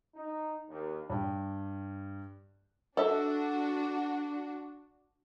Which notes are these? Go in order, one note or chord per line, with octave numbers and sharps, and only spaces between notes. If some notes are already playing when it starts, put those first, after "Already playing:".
D#4
D#2
G2 G4 G5
D4 F#4 A4 E5